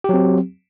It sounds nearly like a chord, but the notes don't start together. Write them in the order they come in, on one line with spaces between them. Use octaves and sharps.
G4 F#3 C4